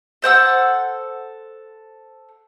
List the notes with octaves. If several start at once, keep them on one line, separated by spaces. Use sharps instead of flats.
A4 C5 F#5 E6